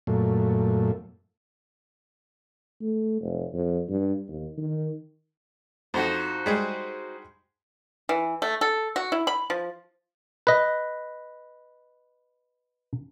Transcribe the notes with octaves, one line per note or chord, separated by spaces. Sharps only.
F#2 A#2 A3
A3
F1
F2
G2
D#2
D#3
F2 D#4 F#4 C5
G3 G#3 G#4
E3
A3
A4
F#4
E4
B5
F3
B4 D#5